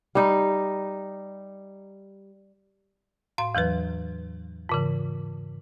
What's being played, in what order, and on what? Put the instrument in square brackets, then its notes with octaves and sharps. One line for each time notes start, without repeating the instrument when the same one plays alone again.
[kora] G3 D#4
[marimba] A2 F5 C6
E2 E3 F#3 B4
G#2 C#3 E3